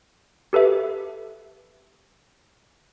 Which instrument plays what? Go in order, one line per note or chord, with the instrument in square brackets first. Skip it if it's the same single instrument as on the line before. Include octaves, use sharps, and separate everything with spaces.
[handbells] G4 A4 B4 E5